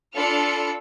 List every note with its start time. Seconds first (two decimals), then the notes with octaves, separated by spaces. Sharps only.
0.16 D4 F4 A4 B5 F6 C#7